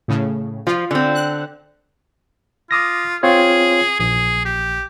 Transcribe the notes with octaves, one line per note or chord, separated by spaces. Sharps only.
A2 C#3
F3 F4
D3 C4
F#6
F4 D6 D#6 A#6
C4 F4 G#4 C#5
A#1 G#4
G4